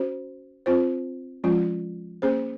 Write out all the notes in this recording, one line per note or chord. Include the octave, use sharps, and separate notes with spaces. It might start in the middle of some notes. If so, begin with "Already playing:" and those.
Already playing: C#4 F#4 C5
C4 F4 C5
F3 G#3 C#4 F4
A#3 C#4 G#4 C5